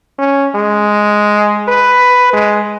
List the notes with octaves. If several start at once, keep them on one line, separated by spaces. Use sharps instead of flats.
C#4
G#3
B4
G#3